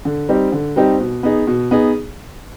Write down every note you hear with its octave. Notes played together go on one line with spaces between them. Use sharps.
D3
G3 C4 D#4 G4
D3
G3 C4 D#4 G4
B2
B3 D#4 G#4
B2
B3 D#4 G#4